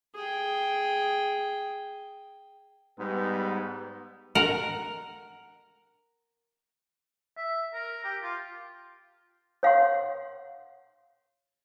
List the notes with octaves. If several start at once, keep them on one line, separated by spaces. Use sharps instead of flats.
G#4 G5
G#2 G3 B3
A#4 F#5
E5
A#4
G4
F4
C#5 F5 F#5 C6